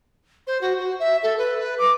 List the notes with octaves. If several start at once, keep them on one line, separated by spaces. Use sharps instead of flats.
C5
F#4
F#4
E5
A4
B4
B4
D6